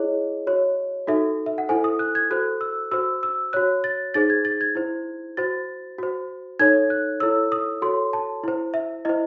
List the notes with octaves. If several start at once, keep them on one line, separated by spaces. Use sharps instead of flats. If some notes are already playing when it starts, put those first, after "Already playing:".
Already playing: E4 G#4 C#5 D#5
F#4 C#5
D#4 F#4 A4 E5
E5
F#5
E4 A4 C5 G#5
D#6
F#6
G#6
F#4 A4 C5 F#6
E6
F#4 C5 E6
E6
F#4 C#5 F#6
A6
D#4 G#4 C5 A6
G#6
A6
G#6
E4 C5
F#4 C5 A6
F#4 C5
D#4 A4 C#5 G#6
F#6
E4 A4 C#5 E6
D#6
F#4 A4 C#5 C6
A5
E4 C5
E5
E4 C5 D#5